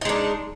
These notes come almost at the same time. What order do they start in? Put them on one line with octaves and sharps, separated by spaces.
D#4 G#3 D4